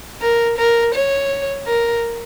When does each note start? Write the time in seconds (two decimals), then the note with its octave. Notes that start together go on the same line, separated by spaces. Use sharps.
0.22 A#4
0.58 A#4
0.94 C#5
1.67 A#4